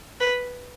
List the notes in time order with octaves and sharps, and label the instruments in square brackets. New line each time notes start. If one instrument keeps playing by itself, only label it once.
[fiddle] B4